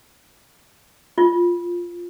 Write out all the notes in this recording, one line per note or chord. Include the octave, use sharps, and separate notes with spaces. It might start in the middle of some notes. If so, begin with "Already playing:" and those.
F4